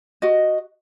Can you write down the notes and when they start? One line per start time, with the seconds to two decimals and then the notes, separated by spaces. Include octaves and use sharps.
0.22 F#4 D#5